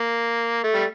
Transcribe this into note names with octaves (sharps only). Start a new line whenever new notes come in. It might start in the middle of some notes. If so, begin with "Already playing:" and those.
Already playing: A#3
A3
G3